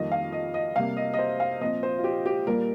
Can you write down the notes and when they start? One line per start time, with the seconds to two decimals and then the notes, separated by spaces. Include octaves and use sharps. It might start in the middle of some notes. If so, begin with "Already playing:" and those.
Already playing: F2 D#3 G3 A#3 D#5
0.12 F5
0.33 D#5
0.54 D#5
0.76 C3 G3 A#3 F5
0.97 D#5
1.14 D#5
1.18 C5
1.40 F5
1.61 A#2 F3 C4 D#5
1.83 C5
1.99 F4
2.04 G4
2.26 G4
2.47 A#2 G3 A#3 A#4